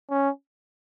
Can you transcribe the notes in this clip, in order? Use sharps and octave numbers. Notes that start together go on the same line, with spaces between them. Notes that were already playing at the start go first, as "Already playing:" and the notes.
C#4